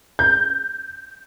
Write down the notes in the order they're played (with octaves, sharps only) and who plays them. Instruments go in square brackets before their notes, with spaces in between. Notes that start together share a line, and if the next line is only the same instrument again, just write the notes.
[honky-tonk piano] G6